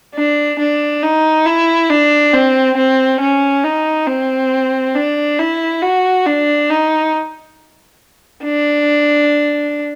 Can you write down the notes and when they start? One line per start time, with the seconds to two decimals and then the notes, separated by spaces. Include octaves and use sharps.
0.15 D4
0.59 D4
1.03 D#4
1.46 E4
1.90 D4
2.34 C4
2.77 C4
3.20 C#4
3.64 D#4
4.08 C4
4.95 D4
5.39 E4
5.82 F#4
6.26 D4
6.70 D#4
8.44 D4